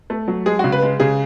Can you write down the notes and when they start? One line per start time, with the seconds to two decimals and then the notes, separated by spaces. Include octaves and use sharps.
0.10 A3
0.28 F#3
0.46 G#3 G#4
0.59 F#4
0.64 C#3
0.72 B4
0.82 G#3
1.00 C#3 G#4